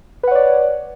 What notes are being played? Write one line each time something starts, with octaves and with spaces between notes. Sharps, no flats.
B4 C#5 D5 F#5